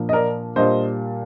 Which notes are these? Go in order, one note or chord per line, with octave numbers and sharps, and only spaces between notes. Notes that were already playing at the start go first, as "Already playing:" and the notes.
Already playing: A#2 F3 A#3 D4
D#5
A#4 D5
A#2 G3 D4 C5 D#5